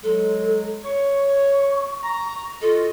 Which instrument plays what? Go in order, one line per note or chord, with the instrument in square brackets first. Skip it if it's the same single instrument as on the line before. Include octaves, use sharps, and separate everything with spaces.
[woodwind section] F#3 G#3 [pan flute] A4
[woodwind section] C#5 [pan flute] C#6
[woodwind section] A#5
[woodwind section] F4 F#4 D#5 [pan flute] A4